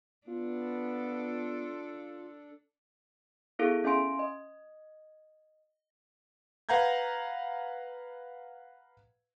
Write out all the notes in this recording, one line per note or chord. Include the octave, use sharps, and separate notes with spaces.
B3 D4 F4 A4
B3 E4 G#4 A4 F5
C#4 E5 F5 G#5 C6 D7
D#5
B4 F5 F#5 A#5 G6 G#6